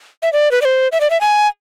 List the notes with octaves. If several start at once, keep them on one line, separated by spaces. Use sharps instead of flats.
E5
D5
B4
D5
C5
E5
D5
E5
G#5